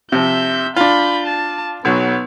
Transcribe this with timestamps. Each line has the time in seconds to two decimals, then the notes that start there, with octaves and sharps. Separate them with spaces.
0.12 C3 F3 E5 G6
0.76 D4 F4 B5 G6
1.27 A5
1.85 B1 F#3 B3